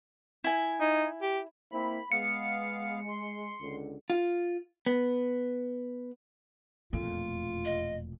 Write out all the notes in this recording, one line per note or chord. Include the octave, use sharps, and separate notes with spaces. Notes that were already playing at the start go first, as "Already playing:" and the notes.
E4 G#5
D#4
G4
A#3 C4 E4 B5
G#3 B3 F5 C#7
C6
C#2 D3
F4
B3
E1 F2 A#2 A3 F4
D#5